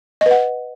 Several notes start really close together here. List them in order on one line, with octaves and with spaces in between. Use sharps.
D#5 B4 F#5